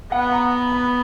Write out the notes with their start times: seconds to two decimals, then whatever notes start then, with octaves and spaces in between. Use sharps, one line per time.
0.12 B3 F#5
0.32 A#5
0.72 B5